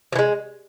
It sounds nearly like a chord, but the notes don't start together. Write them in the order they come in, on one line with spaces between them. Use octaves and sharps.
F3 E3 G#3